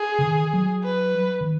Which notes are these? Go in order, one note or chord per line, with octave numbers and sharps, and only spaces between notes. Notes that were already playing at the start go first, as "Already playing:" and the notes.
Already playing: G#4
C#3
D#3
F#3
B4
D#3